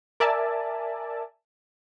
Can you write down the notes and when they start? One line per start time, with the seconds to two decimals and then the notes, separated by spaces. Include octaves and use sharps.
0.20 A#4 D5 E5 G#5 A5